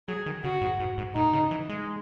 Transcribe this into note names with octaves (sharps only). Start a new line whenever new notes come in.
F#3 G#4
D#3
C#3 F#4
G#2
G#2
G#2
A2 D#4
C#3
E3
G#3